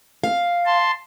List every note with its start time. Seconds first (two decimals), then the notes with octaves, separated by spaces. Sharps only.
0.24 F5
0.66 A5 C6